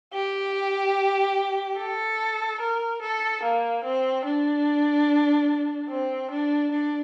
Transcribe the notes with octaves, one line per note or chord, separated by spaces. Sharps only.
G4
A4
A#4
A4
A#3
C4
D4
C4
D4
D4